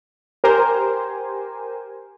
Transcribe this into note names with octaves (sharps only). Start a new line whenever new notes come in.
G4 A#4 C5 G#5